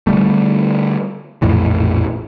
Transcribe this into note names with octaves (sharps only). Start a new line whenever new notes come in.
D3 G3 A3
A#1 F2 A2 E3